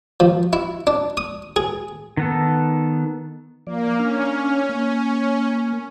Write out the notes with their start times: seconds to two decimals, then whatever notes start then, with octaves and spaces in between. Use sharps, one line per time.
0.20 F3
0.53 E4
0.87 D4
1.17 D#6
1.56 G#4
2.17 D#3 B3 A4
3.67 F3 A#3 D5
3.99 C#4 D4 F6
4.69 A#3